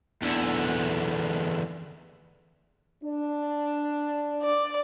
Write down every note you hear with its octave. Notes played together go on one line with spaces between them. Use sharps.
E2 D3
D4
D5